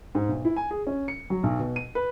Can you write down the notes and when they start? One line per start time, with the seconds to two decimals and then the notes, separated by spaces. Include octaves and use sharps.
0.15 G#2
0.29 B1
0.45 E4
0.56 G#5
0.71 G#4
0.87 C#4
1.08 C#7
1.30 F#3
1.43 B1
1.60 B2
1.76 D#7
1.95 B4